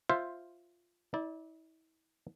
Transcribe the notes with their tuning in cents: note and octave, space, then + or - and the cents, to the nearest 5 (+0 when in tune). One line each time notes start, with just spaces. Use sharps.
F4 +0 C5 +10 E5 +0
E4 -40 D5 +0